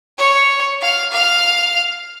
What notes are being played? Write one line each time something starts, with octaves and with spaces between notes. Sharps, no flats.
C#5
F5
F5